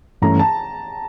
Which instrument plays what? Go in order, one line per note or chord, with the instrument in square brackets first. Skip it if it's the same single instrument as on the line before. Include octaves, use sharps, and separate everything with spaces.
[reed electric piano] G2 E3 A3 C#4 [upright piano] A#5
[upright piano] A5